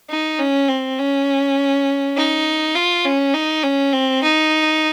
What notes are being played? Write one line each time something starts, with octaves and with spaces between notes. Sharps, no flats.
D#4
C#4
C4
C#4
D#4
F4
C#4
D#4
C#4
C4
D#4